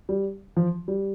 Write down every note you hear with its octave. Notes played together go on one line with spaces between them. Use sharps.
G3
F3
G3